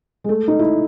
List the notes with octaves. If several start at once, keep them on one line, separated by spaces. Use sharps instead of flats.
G#3
A3
D#4
E4